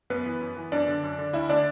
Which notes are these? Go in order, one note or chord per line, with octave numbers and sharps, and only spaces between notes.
F#2 B3 B4
E3
F#2
E3
F#2 D4 D5
D3
F#2
D3
D2 E4 E5
D3 D4 D5